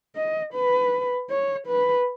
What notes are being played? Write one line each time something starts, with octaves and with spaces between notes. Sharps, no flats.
D#5
B4
C#5
B4